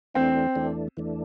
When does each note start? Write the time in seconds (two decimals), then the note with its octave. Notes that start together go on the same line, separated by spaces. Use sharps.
0.14 E2 E3 A3 C4 D4
0.55 E2 E3 A3 D4
0.97 E2 E3 A3 D4